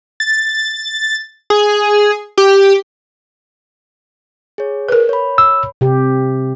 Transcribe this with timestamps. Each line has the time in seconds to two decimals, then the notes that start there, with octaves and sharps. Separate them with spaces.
0.20 A6
1.50 G#4
2.38 G4
4.58 G#4 C#5
4.89 A#4 B4
5.09 C#5 B5
5.38 E6
5.81 C3 G4